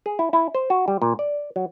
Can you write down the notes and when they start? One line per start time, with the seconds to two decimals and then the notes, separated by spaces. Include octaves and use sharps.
0.06 G#4
0.19 E4
0.33 E4
0.55 C5
0.70 F#4
0.88 G3
1.02 A#2
1.19 D5
1.56 F#3